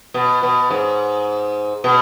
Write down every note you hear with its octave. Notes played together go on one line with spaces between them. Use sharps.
B2
B2
G#2
B2